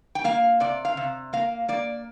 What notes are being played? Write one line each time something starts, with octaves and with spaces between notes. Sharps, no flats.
G5
A#3 F5
C3 D5
F5
C3
A#3 F5
A#3 D5